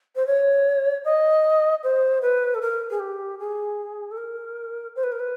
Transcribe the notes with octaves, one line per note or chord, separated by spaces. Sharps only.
C5
C#5
D#5
C5
B4
A4
A#4
G#4
G4
G#4
A4
A#4
C5
B4
A#4
B4